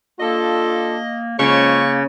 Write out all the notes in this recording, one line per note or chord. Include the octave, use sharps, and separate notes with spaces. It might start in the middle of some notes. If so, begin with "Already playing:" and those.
A#3 D4 F4 A4 D#5
C#3 F3 G#3 A#3 C#5 C#6